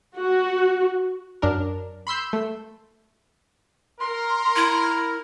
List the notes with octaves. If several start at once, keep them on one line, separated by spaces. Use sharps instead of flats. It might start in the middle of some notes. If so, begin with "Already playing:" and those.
F#4
F#2 D4 A#4
B5 C6 E6 G6
A3
A#4 C6
E4